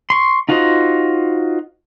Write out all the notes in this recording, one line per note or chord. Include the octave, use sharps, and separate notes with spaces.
C6 C#6
D#4 F4 F#4 C5 D#5